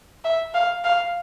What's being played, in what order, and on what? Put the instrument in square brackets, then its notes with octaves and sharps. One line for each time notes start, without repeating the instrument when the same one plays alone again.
[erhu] E5
F5
F5